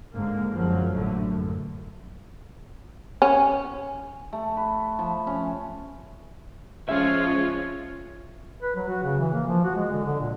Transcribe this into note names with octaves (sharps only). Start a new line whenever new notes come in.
G#2 D3 G#3 A#3
F#2 F3 F#3 G#3
A1 D3 A3
F#2
C#4
A3
B4
F3
C#4
F3 G#3 C#4 F4 C#5 E5
B4
F#3
F#4
C#3
E3
A#3
F3
F#4
G#3
D3
D3
A#2